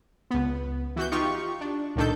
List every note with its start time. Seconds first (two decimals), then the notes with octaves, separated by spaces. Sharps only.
0.31 C#2 B3
0.96 E3 F#4 G6
1.12 D#4 F4 G4 C#6
1.61 D4
1.96 C#2 A#2 D#3 D4 A4 G6